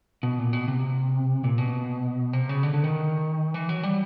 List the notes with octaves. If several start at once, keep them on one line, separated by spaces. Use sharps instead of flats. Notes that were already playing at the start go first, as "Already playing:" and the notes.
B2
A#2
B2
C3
A#2
B2
C3
C#3
D3
D3
D#3
E3
F#3
G3